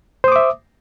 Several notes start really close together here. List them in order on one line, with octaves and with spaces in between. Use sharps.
C5 D#6 D6 E5